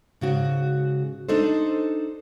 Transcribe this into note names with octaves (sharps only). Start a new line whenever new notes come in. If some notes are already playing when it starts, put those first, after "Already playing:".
G#2 C#3 F#4
D4 D#4 A4 C5